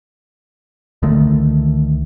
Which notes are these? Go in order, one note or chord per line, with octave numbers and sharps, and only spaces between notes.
C#2 D3 D#3 A3